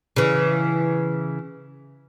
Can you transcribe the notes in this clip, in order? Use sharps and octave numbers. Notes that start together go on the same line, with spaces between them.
C#3 E3